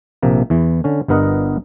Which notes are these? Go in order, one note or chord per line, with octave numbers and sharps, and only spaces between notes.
A#1 C3 A#3
E2 E3
D3 C#4
G1 G2 B3 A#4 D#5 F#5